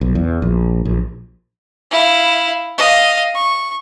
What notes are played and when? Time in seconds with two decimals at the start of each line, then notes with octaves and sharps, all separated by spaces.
0.01 B1
0.15 E2
0.42 A#1
0.85 A#1
1.91 E4 F5
2.78 D#5 F5
3.35 C#6